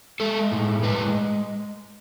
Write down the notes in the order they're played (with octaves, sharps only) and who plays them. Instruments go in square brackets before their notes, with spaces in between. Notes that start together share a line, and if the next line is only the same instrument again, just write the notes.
[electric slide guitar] G#3 A4
A2
G#3 B4